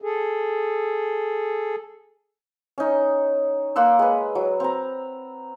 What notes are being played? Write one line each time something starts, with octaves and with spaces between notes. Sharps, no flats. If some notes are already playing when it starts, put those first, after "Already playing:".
G#4 A4
C#4 D#4
A#3 F#5 C6 E6
G#3 B4
F#3
C4 A#5